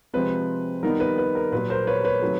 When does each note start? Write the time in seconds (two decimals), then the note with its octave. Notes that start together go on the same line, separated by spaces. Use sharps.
0.14 C3 F3 G#3 C4 B4
0.83 D#3 G3 B3 D#4 A#4
1.00 B4
1.18 B4
1.35 A#4
1.52 A#2 F#3 A#3 B4
1.70 A#4 C5
1.87 B4 C#5
2.05 B4 C#5
2.22 C3 D#3 F#3 A3